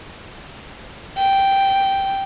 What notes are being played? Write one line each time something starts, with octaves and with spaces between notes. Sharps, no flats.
G5